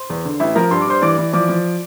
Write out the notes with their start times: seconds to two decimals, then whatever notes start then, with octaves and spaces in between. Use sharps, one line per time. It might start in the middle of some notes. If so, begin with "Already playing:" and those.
Already playing: C5 C6
0.10 E2
0.25 D3
0.40 A1 E4 E5
0.55 F3 A#4 A#5
0.71 G2 C6
0.81 D6
0.87 G2 C5 C6
1.02 E3 D5 D6
1.18 E3
1.33 F3 D5 D6
1.49 F3